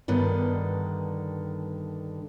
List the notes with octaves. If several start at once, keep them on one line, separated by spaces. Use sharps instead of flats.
G2 D3 D#3 B3